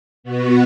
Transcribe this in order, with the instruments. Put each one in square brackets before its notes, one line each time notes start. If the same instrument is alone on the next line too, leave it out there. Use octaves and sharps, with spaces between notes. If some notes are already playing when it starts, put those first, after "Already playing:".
[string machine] B2 B3 F#4